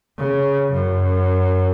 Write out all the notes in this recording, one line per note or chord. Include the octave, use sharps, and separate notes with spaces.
C#3
F#2